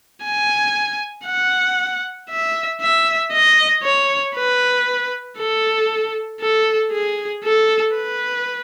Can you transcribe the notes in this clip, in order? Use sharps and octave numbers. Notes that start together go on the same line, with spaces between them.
G#5
F#5
E5
E5
D#5
C#5
B4
A4
A4
G#4
A4
B4